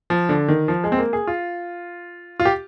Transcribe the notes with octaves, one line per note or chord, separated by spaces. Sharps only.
F3
D3
D#3
F3
G#3
C4
A#3
G#4
F4
F4
G4